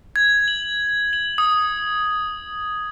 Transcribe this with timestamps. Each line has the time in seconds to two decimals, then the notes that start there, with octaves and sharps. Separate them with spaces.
0.16 G#6
0.48 F#7
1.13 F#7
1.38 D#6